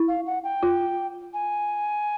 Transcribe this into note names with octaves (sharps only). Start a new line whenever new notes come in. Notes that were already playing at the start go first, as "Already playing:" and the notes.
Already playing: E4
F5
F#5
G5
F4
G#5